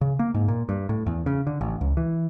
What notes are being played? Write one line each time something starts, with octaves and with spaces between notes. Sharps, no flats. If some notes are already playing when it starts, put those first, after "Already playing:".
C#3
A#3
G#2
A#2
G2
A2
E2
C#3
D3
A1
C#2
E3